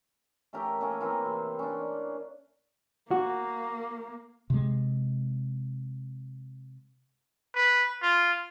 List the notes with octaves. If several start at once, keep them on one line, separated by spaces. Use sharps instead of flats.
A3 C#4 G4 A#4
A#3 C#4 A4 G#5
E3 A#3 C4 A#5
C3
C#4 D4
A#3 F#4
C3 G#3
B4
F4